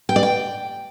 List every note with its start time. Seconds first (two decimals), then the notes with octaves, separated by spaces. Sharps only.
0.09 G5
0.16 D5
0.23 G5